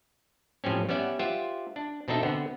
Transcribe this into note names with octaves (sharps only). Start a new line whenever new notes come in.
A2 F3 G3 C4 C#4
G3 B3 C#4 D5 E5 F#5
F4 G4 C5 E5 F#5
D4
B2 C4 D4 D#4 A4 E5
D3 B3 C4